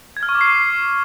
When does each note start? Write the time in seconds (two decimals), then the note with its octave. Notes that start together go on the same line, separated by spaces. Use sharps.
0.17 G#6
0.23 F6
0.29 C#6
0.35 D6
0.41 C7